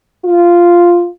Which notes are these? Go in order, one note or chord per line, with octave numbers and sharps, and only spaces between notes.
F4